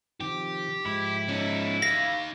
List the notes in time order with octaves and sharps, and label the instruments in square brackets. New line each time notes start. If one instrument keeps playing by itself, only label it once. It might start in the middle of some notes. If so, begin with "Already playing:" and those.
[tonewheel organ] C3 D#3 F3 [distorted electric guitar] G4
[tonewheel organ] G#2 F3 G#3 [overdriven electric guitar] E4
[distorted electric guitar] C#4 D#4
[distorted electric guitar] D#4 F5 [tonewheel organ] B5 [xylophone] A#6